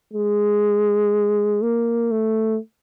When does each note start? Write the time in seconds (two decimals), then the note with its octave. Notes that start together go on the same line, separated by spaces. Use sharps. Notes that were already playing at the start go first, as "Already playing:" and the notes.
0.13 G#3
1.62 A#3
2.11 A3